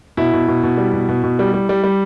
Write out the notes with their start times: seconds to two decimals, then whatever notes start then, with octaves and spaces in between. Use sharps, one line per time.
0.17 B2 E4
0.33 B2
0.48 B2
0.63 B2
0.78 G3
0.93 B2
1.09 B2
1.24 B2
1.39 G3
1.54 G3
1.69 G3
1.84 G3